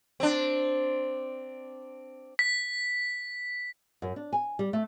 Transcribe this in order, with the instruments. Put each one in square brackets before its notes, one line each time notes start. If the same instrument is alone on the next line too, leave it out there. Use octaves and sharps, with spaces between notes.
[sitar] C4 D4
[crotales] B6
[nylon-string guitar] F#2
D4
G#5
G3
A3